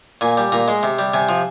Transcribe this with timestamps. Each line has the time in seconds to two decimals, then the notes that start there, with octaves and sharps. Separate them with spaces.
0.21 A#2 G#5
0.37 G3
0.52 A#2 A#5
0.68 G#3
0.83 C3
0.99 G3
1.14 C3 G#5
1.29 F3